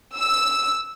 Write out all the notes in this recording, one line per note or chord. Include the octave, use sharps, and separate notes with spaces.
E6